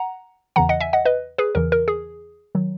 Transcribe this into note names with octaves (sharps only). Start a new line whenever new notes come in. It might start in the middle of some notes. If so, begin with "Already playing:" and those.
Already playing: F#5 A#5
E2 C#3 E3 F#5 A#5
D#5 F#5
E5 G#5
D#5 F#5
B4 D#5
G#4 B4
E2 C#3 E3 A#4
A#4
G#4
D#3 F#3